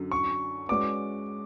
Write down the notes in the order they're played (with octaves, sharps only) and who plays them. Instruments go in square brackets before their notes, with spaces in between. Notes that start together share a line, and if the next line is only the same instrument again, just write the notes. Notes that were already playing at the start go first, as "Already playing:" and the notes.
Already playing: [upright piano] F#2 D3 F#3
[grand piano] C#6
[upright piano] G#3 C#4 F#4 B4 D5 [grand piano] D6